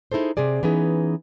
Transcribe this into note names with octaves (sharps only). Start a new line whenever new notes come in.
D#4 E4 G#4 A4 C5
C3 C4 G#4 D5
E3 B3 C#4 D#4 G#4